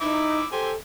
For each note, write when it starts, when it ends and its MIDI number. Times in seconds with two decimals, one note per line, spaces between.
0.01 0.40 63
0.01 0.46 64
0.01 0.46 76
0.01 0.46 86
0.52 0.71 67
0.52 0.75 69
0.52 0.71 72
0.52 0.71 80